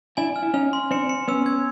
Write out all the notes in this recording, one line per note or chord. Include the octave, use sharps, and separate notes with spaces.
D4 E4 G#5
F6
E4
C#4 D#4 F6
C6
C4 D4 C#7
C#7
B3 C#4 E6
G#6